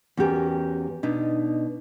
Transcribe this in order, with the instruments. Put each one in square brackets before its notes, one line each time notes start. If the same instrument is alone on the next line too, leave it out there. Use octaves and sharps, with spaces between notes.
[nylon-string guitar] E2 C#4 F#4 G4 A#4
B2 D4 D#4